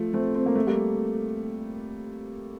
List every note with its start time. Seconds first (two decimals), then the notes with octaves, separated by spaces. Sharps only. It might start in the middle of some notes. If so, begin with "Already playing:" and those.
Already playing: F3 A3
0.14 A3 C4
0.35 C4
0.46 A#3
0.55 A3
0.67 G3 A#3